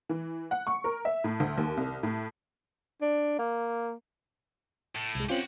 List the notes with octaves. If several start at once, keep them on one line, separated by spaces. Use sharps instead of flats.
E3
F#5
C#6
A#4
E5
A2
D2
D#2
C2
A2
D4
A#3
A2
C2 G#3
C4 C#4 F4 G4 F#5